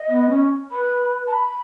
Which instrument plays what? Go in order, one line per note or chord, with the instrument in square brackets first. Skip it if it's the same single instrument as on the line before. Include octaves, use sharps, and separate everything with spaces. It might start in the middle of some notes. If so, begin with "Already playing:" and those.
Already playing: [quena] D#5
[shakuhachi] B3
C#4
[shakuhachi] B4 [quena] B5
[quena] A5
B5